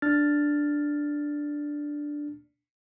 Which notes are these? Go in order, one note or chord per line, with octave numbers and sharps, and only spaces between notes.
D4 F6 A6